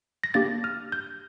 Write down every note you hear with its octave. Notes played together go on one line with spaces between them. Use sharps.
A#6
A#3 D4 G4 A6
F6
G6